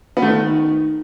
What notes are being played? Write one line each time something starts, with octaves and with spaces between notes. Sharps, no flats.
B3
A3
D#3